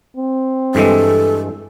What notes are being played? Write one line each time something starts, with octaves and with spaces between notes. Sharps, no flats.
C4
G2 E3 G#3 A4